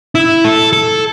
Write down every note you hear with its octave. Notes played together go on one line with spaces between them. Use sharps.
E4
A4
A4